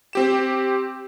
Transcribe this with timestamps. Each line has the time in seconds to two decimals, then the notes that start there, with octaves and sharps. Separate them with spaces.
0.13 C4 G4 E7